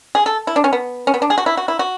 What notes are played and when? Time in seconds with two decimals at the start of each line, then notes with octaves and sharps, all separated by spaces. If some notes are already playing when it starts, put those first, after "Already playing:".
0.15 G#4
0.26 A4
0.47 E4
0.56 D4
0.64 C#4
0.73 B3
1.07 C#4
1.14 B3
1.22 D4
1.30 G#4
1.38 F#4
1.46 E4
1.57 F#4
1.68 E4
1.79 F#4